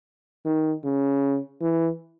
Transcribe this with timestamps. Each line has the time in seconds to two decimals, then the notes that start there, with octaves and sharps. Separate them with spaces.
0.45 D#3
0.84 C#3
1.61 E3